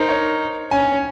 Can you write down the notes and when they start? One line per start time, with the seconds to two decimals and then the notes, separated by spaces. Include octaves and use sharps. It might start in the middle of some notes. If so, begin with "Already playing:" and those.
Already playing: D#4 A#4 C5
0.09 C#5
0.71 C#4 G#5